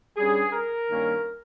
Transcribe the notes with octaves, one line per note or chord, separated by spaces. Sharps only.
G2 G3 C#4 G#4
A#4
G2 D#3 A#3 C#4